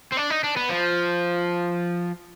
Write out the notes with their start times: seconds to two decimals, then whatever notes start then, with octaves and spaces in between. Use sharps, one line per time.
0.12 C4
0.17 D4
0.30 D#4
0.44 D4
0.56 B3
0.69 F3